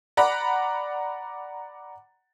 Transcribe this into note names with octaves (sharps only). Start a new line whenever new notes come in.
D5 F#5 A#5 B5